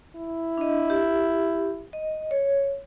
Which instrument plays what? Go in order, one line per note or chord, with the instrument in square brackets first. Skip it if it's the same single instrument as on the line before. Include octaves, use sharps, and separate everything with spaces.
[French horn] E4
[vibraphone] D4 D#5
G4
D#5
C#5